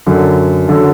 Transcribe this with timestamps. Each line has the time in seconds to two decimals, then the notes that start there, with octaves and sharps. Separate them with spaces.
0.06 F#2 D3 F#3
0.68 F#2 D3 F#3